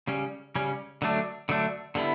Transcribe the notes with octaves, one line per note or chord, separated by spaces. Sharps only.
C#3 G3 C#4
C#3 G3 C#4
D3 F#3 A3 D4
D3 F#3 A3 D4
D3 G3 B3 E4